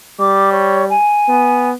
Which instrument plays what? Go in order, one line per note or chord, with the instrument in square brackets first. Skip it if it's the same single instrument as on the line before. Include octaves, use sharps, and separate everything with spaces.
[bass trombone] G3 [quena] D6
[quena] C#5
G#5
[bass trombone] B3